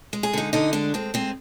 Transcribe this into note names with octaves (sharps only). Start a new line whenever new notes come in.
G#3
G#4
D3 D#4
D3 D#4
G#3 D4
G#3 C4
G#3 C4